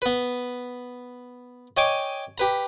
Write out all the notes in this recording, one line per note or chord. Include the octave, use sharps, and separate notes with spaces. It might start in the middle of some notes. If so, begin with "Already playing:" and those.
B3 B4
C#5 D#5 G5 G#5 C#6 D6
G4 B4 A#5